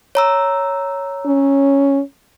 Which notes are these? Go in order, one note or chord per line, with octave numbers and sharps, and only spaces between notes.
C#5 A#5 E6
C#4